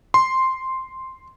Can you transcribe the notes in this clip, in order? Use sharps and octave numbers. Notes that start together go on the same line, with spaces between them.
C6